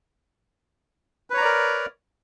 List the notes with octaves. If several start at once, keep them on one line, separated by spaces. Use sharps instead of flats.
A#4 B4 C#5 D5 A#5